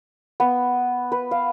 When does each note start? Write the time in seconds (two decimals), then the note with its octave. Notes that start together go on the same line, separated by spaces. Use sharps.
0.40 B3
1.12 B4
1.31 F5